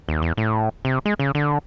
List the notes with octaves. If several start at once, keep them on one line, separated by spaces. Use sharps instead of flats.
D#2
E2
A2
C3
G#3
C#3
D3